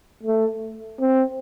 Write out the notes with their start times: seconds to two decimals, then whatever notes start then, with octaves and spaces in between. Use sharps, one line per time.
0.23 A3
1.00 C4